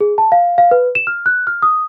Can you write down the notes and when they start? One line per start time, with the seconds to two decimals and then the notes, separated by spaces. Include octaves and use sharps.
0.01 G#4
0.18 A5
0.32 F5
0.58 F5
0.71 B4
0.95 E7
1.07 F6
1.26 F#6
1.47 F6
1.62 D#6